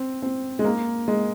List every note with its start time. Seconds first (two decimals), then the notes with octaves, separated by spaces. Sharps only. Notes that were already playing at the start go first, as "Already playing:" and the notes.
Already playing: C4
0.22 C4
0.59 G#3
0.65 A#3
1.08 G#3